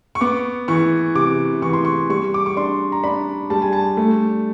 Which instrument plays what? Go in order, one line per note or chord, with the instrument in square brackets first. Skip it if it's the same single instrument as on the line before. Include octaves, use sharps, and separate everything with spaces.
[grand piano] C#6
B3 D6
E3 C#6
C3 D6
E3 C#6
C6
C#6
G3 C#6
D6
C#6
D4 C6
A#5
D4 B5
G3 A5
G#5
A5
A3